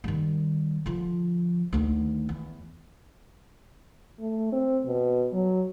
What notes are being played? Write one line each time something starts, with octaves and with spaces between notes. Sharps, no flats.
D#3 G3
D3 F3
D2 D#3
E2
A3
C4
B2
F#3